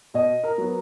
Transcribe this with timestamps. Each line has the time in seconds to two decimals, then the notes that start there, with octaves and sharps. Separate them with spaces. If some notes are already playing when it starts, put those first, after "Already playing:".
0.14 B2 D#5
0.44 A#4
0.58 F#3 B3